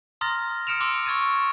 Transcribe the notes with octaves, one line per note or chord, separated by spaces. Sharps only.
A#5 C6 D#6 F6 A6 A#6
D#6 F6 C#7 D7 E7 F7
C6 D6 E6
C#6 E6 G#6 A6 D#7